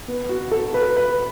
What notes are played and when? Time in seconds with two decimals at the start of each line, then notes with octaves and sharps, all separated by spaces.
0.08 B3
0.29 F#4
0.51 A4
0.74 B4
0.96 B4